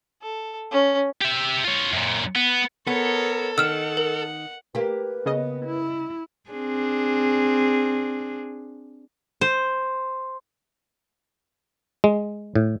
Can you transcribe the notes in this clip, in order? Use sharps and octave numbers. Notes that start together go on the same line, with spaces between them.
A4
C#4
G4 E5
F4 C#5
F#2 A#2
B3
B3 A4 A#4 C#5
D#3 F#5 E6 F6 E7
A#4
A#3 G4 B4
C#3 B3 D#5
E4
C4 D4 G#4
C5
G#3
A2